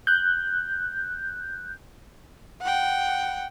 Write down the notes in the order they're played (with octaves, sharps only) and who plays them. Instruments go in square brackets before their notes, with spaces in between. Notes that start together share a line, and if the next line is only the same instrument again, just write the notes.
[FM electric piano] F#6 G6
[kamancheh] F#5 G5